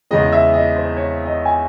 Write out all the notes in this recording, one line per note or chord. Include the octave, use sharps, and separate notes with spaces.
E2 C#3 E3 G#3 D#5
E5
D#5
C5
C#5
D#5
G#5